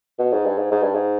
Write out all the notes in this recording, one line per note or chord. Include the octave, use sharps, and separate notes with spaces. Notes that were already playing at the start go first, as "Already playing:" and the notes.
B2
G#2
G2
G#2
G#2
G2
G#2